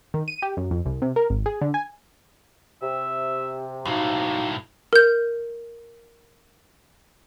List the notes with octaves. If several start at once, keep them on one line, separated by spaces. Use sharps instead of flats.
D#3
D#7
G4
F#2
F2
C2
C3
A#4
G#1
G#4
D3
G#5
C3 E5
B1 A2 A#3 D#4 F#4 F5
A#4 G6